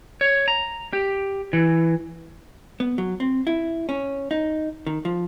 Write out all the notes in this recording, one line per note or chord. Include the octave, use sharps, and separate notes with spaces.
C#5
A#5
G4
E3
B3
F#3
C4
E4
C#4
D#4
D#3
F3